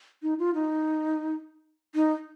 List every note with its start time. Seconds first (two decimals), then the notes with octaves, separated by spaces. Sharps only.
0.23 D#4
0.39 F4
0.54 D#4
1.95 D#4